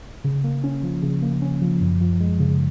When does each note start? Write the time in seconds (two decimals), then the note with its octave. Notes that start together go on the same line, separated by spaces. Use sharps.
0.24 C#3
0.44 A#3
0.64 C#4
0.83 F3
1.03 C#3
1.22 A#3
1.42 C#4
1.62 F3
1.81 F#2
2.01 F3
2.20 G#3
2.40 C#3